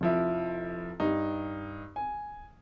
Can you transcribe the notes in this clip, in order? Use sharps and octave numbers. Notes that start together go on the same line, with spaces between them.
F1 F3 E4
G2 D#4
G#5